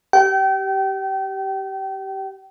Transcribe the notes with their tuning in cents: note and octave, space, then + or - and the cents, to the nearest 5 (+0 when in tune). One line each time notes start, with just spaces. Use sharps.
G4 -15 G5 -30